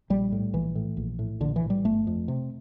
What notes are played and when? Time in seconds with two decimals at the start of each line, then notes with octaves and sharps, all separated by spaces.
0.10 A#1 G3
0.32 A2
0.53 A#1 E3
0.75 A2
0.97 A#1
1.19 A2
1.40 A#1 D3
1.56 E3
1.62 A2
1.70 G3
1.85 G1 A3
2.07 F2
2.28 C3